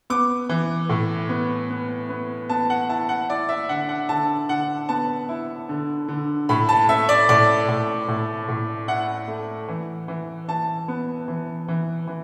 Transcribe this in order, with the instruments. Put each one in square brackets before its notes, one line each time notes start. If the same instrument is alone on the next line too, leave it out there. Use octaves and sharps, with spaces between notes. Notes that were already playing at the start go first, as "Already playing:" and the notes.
[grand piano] B3 D6
E3
A2
B3
B3
B3
B3 A5
F#5
E4 A5
F#5
E4 D5
E5
D3 F#5
F#5
D3 A5
D3 F#5
B3 A5
E4
D3
D3
A2 B5
A5
A3 E5
D5
A2 D5
A2
A2
A2
E4 F#5
A3
E3
E3
E3 A5
B3
E3
E3
E3